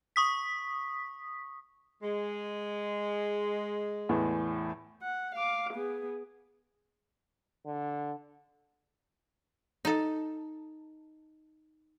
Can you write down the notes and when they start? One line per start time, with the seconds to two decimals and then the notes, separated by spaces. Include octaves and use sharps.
0.16 C#6 D#6 B6
2.02 G#3
4.09 E2 A2 E3
5.02 F#5
5.35 F5 D6
5.74 B3 G#4
7.66 D3
9.85 D#4 A4